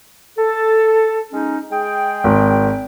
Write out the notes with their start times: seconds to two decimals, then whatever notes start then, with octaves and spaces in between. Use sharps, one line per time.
0.38 A4
1.33 G#3 C#4 D#4
1.71 G#3 G#4 G5
2.24 G#1